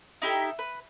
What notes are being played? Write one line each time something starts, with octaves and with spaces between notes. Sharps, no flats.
D#4 E4 G4 A4
B4